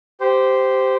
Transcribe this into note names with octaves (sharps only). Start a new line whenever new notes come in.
G4 C5